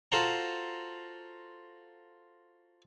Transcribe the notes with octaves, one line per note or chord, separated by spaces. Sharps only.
F4 F#4 A4 C5 F#5 A#5